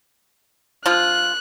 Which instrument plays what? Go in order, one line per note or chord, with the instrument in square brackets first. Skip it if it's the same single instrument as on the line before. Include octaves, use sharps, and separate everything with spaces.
[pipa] F3 F4 [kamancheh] F#6